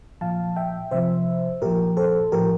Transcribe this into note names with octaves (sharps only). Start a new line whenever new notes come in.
A#2 F3 F5 A5
E5 G5
C3 F3 C5 E5
A#2 F3 G4 A#4
A4 C5
A2 F3 G4 A#4